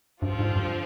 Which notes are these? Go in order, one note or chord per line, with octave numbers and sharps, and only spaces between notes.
G2 D3 F3 C4 F4
G#2
G2